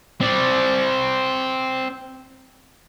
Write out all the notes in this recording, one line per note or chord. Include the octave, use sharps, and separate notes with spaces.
C4 D5